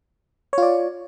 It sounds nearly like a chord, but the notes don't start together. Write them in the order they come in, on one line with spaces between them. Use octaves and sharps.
C#5 F4 D5